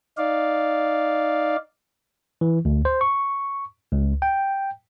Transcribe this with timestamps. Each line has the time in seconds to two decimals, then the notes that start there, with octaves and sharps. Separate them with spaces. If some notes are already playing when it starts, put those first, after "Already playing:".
0.17 D#4 D5 F5
2.41 E3
2.65 D2
2.85 C5
3.01 C#6
3.92 C#2
4.22 G5